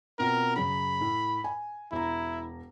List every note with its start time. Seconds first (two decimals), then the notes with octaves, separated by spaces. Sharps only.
0.19 B2 C4 F4 A#4
0.56 F#2 C#3 B5
1.01 A2
1.44 G#5
1.92 E1 E4 A#5